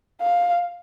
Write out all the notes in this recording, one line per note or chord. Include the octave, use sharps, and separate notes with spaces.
F5